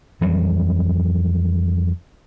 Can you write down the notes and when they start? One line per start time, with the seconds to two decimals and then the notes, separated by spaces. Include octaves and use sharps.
0.21 F2 E3 F#3 G3